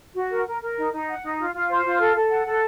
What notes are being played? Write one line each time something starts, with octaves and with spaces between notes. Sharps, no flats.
F#4
A#4
A#4
A#4
D#4
D#4
F#5
D#4
F4
F4
C5
F4
A4
A4
F#5
A4